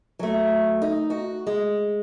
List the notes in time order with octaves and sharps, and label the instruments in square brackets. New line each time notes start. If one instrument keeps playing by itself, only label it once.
[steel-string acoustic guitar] F#3 A3
D#4
F#4
G#3